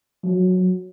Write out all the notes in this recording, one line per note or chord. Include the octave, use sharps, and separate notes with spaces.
F#3